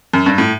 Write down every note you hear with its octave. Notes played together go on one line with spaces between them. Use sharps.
F#2
G2
A2